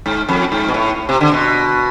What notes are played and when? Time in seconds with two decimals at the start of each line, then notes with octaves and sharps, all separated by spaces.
0.06 G#2
0.29 F2
0.52 G#2
0.68 B2
0.74 A2
1.09 C3
1.21 D3
1.32 B2